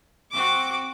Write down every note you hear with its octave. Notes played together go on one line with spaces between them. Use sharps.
C4 F#4 D6